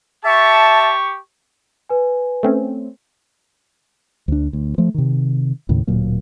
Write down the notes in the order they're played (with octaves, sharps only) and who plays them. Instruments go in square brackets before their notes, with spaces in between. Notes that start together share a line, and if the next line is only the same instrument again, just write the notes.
[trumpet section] G4 C#6 [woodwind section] E5 A5
[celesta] B4 G#5
[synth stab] A3 C4 C#4
[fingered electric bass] D2 D4
D2
F3 A3
C3 D#3
D#2 A2 C#3
D1 A#2 F#3 A#3